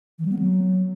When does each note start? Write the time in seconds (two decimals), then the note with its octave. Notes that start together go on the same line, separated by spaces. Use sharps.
0.19 E3
0.25 G3
0.32 B3
0.39 F#3